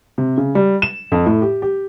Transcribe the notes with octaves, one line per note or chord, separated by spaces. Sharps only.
C3
C#3
G3
E7
F2
A2
G4
G4